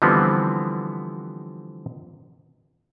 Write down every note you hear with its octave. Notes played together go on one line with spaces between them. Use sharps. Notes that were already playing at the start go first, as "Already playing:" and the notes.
D3 E3 F3 G3 B3 C4